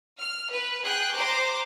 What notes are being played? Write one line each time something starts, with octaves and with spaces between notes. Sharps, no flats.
F6
B4
G#4 G5 F#6
C5 A#5 C6 D6